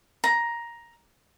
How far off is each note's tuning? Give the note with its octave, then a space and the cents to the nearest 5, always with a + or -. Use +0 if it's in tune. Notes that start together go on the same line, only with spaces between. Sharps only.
A#5 +10